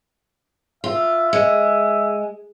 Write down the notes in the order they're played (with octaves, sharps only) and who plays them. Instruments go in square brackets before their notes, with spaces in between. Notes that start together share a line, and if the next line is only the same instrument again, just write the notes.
[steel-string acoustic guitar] F4 [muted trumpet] E5
[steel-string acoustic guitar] G#3